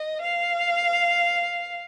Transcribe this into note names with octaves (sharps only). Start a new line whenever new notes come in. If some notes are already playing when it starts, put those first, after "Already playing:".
Already playing: D#5
F5